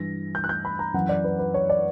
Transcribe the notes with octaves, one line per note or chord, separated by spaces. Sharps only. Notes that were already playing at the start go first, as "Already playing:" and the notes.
Already playing: G2 E3 A#6
G6
F#6
G6
B5
A#5
F#2 E3 F#5
D5
B4
B4
C#5
D5